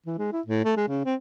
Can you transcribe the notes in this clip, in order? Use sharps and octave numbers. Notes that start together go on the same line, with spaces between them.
E3
G#3
E4
A2
A3
G#3
C#3
C4